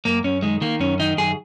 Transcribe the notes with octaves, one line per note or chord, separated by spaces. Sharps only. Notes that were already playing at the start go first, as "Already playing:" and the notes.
F#2 A#3
F#2 C#4
D#3 G#3
D#3 A#3
F#2 C#4
D#3 D#4
F#2 G#4